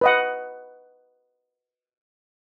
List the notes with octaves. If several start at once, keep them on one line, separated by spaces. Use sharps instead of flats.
B4 D#5 F#5